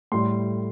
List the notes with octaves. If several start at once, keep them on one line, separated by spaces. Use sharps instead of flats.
A2 G3 C6